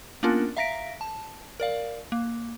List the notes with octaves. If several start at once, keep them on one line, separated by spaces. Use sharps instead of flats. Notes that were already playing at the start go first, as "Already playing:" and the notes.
A#3 B3 C#4 D4 F4 A#4
E5 F5 A#5 A#6 B6 D7
A5
A#4 D5 F5
A#3